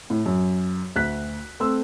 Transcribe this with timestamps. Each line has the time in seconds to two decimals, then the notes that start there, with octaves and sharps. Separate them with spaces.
0.10 A2
0.26 F#2
0.96 D2 F#6 B6
1.60 A3 C4 C6 E6